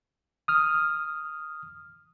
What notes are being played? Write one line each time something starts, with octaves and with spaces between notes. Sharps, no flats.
D#6 F6